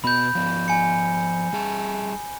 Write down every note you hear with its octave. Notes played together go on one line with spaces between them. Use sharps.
B2 B3 B5 G6
F3 B3
G#5 C#7
G3 G#4 A5